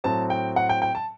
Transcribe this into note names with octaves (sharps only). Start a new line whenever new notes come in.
A2 F#3 C4 A5
G5
F#5
G5
G5
A5